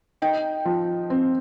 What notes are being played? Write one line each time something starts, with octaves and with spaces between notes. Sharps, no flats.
D#4 G5
F3
C4